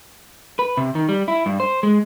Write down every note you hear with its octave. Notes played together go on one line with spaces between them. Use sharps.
B4
C3
D#3
G3
E4
G2
C5
G#3